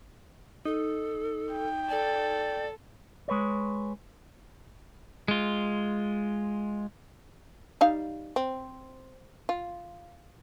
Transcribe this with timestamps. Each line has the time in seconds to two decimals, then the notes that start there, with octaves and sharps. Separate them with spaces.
0.65 D#4 A4
1.52 G5
1.90 A4 D5
3.28 G#3 B4 C#5
5.28 G#3 F4
7.81 G3 D#4 F5
8.36 C4
9.49 F4